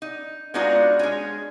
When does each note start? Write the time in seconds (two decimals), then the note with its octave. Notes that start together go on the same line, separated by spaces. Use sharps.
0.02 D#4
0.54 G#3 B3 D4 D#4 F4 F#4
0.99 G#3 C#4